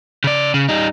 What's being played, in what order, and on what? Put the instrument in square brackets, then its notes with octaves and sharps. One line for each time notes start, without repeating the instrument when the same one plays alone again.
[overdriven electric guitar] C#3 D5
C#3
G3 D#4